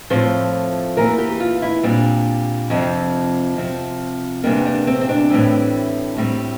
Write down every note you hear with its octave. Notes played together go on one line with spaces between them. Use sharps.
A2 F3 A3 C4 C5
E2 E3 A#3 A#4
G4
F4
E4
A#2 G3 C4 D4
F2 C3 F3
C3 F3 C4
E2 C3 G3 A#3 D4
D4
C4
C4
D4
A2 E3 G3 C4
A2 G3 C4